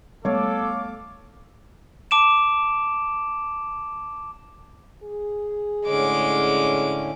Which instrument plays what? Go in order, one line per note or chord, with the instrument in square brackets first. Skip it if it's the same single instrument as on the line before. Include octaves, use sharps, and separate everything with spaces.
[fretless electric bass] G3 A3 B3 [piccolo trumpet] A4 [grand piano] C#5 [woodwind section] F5 D6
[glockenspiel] A5 D6 D7 E7
[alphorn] G#4
[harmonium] A2 D3 C#4 [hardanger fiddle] G#3 D6